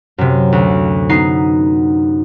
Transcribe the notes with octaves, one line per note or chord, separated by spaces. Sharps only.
F#2 C3
D2
B3 D#4 C7